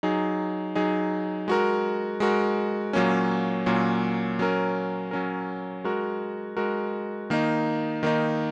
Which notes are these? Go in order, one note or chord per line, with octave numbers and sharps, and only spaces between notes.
F#3 D#4 G#4
F#3 D#4 G#4
G#3 F#4 A#4
G#3 F#4 A#4
A#2 F#3 A#3 C#4
A#2 F#3 A#3 C#4
F#3 C#4 A#4
F#3 C#4 A#4
G#3 F#4 A#4
G#3 F#4 A#4
D#3 A#3 D#4
D#3 A#3 D#4